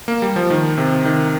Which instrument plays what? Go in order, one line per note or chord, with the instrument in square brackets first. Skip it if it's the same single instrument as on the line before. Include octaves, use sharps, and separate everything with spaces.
[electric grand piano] A#3
G3
F3
D#3
C3
D#3